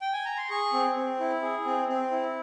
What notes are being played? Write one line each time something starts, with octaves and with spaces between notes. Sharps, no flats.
G5
G#5
A#5
C6
G#4 C#6
C4
C4
E4
G#4
C4
C4
E4